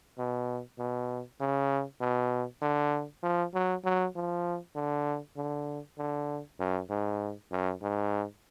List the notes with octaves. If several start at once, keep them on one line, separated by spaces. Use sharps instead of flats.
B2
B2
C#3
B2
D3
F3
F#3
F#3
F3
D3
D3
D3
F#2
G#2
F#2
G#2